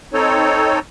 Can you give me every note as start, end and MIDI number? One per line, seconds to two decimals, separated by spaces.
0.13 0.79 60
0.13 0.79 63
0.13 0.79 69
0.13 0.79 73